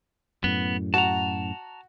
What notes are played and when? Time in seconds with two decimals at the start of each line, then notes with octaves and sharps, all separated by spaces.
0.44 F#2 A2 B3
0.94 F#4 A5 A#5